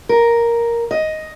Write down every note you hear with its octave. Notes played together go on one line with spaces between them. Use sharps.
A#4
D#5